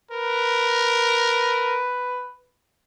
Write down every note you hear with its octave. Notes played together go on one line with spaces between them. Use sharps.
A#4 B4